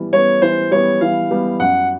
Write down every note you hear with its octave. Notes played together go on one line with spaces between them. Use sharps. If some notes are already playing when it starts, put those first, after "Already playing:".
Already playing: E3 G3 B3
G3 B3 C#5
E3 C5
G3 B3 C#5
E3 F5
G3 B3
F#2 F#5